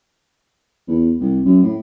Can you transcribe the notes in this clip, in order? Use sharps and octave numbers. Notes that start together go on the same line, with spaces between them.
E2
C2
F#2
A2